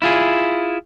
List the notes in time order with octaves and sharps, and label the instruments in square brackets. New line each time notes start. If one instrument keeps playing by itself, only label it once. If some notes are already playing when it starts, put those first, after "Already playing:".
[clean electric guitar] E4 F4 G#4